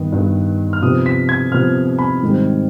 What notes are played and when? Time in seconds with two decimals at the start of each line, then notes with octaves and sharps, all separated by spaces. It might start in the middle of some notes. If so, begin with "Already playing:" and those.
Already playing: G2 D#3 B3
0.12 G2 D#3 B3
0.73 F6
0.82 C3 F3 B3 D#6
1.06 B6
1.29 G#6
1.52 C3 F3 B3 F6
1.99 B5
2.23 G#2 D#3 G3 C4